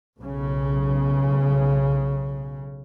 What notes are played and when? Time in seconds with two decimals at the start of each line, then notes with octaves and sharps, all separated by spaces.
0.18 B1 C#3